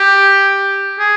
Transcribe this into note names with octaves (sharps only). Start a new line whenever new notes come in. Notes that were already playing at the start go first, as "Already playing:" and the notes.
Already playing: G4
G#4